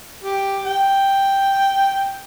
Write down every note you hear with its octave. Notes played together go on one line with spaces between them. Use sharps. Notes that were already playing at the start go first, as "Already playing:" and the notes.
G4
G5